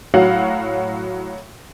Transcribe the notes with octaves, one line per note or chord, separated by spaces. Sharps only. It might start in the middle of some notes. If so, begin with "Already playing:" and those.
A2 F#3 F#4 F5 F#5